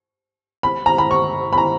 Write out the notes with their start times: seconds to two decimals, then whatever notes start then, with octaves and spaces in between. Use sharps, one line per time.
0.63 B5
0.86 A#5
0.98 B5
1.11 C#6
1.53 B5
1.58 A#5